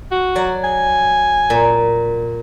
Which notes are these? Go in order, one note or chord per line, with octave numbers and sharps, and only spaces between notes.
F#4
F#3 D5 F#5
G#5
A#2